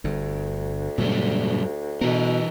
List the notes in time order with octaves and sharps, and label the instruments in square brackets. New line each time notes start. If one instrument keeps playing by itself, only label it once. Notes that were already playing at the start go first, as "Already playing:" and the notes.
[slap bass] G1 G2 [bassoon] D2
[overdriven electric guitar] F#2 G3 [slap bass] A#2 C#3 G#3
[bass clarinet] B2 [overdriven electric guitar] E3 A#4 [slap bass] B3